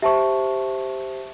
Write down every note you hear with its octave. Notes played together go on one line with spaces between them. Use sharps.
G4 C5 E5 A5 C#6